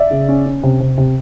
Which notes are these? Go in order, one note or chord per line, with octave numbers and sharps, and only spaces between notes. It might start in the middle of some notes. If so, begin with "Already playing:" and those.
Already playing: D5 E5
C#3
C#4
C#4
C3
C3
C3